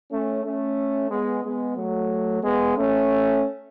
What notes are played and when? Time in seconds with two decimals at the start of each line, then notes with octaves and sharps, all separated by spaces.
0.11 A3 C#4
0.45 A3 C#4
1.10 G#3 B3
1.44 G#3 B3
1.77 F#3 A3
2.43 G#3 B3
2.76 A3 C#4